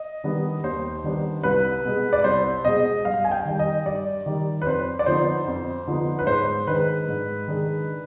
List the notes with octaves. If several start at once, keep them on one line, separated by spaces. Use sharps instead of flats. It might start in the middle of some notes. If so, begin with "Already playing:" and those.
Already playing: D#5
D#3 G3 B3 D4
D#2 C5
D#3 G3 B3 D4
C2 B4
B2 G#3
D5
C2 C5
B2 G#3 D#5
G2 F5
G#5
G5
D#3 G3
D#5
G2 D5
D#3 G3
B4
F2 C5
D5
D3 F3 B3 D#4 C5
F2
D3 F3 B3 D#4
B4
G#2 C5
D#3 G#3 D4 B4
G#2
D#3 G#3 D4